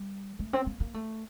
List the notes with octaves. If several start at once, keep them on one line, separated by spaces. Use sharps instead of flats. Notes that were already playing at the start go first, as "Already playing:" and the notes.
Already playing: G3
A3
C4
A#3
A#3
A3